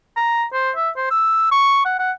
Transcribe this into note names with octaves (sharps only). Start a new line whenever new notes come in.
A#5
C5
E5
C5
E6
C#6
F#5
F#5